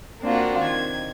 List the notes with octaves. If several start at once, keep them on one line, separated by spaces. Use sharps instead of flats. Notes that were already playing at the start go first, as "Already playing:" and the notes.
A#3 C4 D4 F4 F#4
D#3 G#6